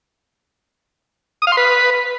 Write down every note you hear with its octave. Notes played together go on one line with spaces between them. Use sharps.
D#6
F5
C6
B4